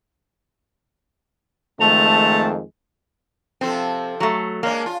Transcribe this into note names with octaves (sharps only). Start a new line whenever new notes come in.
F2 D#3 G#3 A3 A5 F7
C3 F3 C4 A4
F#3 A3
G#3 A#3 C#4 D4
F4